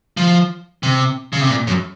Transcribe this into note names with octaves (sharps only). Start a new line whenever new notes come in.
F3
C3
C#3
C3
A#2
F#2